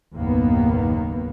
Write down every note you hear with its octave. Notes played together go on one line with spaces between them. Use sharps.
F#1 D#2 A2 D#3 A#3 B3